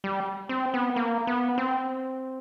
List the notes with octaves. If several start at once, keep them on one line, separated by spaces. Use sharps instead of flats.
G3
C4
B3
A#3
B3
C4